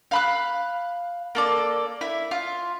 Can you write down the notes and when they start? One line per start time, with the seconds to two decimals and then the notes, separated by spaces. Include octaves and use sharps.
0.11 F5 B5 F#6
1.35 A#3 A4 D5
2.01 E4
2.31 F4